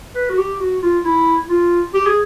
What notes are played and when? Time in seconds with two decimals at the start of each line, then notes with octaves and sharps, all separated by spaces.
0.15 B4
0.30 F#4
0.38 G4
0.60 F#4
0.83 F4
1.05 E4
1.50 F4
1.94 G4
2.06 G#4